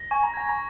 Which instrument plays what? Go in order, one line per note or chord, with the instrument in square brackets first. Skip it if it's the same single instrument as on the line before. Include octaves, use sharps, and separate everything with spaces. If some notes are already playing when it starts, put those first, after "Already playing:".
Already playing: [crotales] A#6
[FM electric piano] G#5 [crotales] C#6
[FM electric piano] A#5
[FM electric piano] G#5 [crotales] G#6
[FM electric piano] A#5